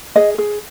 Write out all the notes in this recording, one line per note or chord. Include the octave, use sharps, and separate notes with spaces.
G#4 D#5
G#4